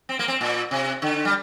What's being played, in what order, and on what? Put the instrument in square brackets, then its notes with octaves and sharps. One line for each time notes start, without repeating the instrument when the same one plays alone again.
[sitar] C4
A#3
C4
A#2
C3
D3
G3